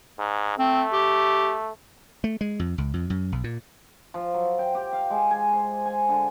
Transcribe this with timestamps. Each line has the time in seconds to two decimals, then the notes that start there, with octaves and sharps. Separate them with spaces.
0.19 G#2
0.59 A3 C4
0.93 G4
2.24 A3
2.41 G#3
2.59 F2
2.78 C#2
2.94 F2
3.10 F#2
3.32 B1
3.44 A#2
4.14 F3
4.34 F#3
4.59 G5
4.75 G4
4.93 F5
5.10 G#3
5.31 G#5
5.53 C5
5.86 G#5
6.09 D3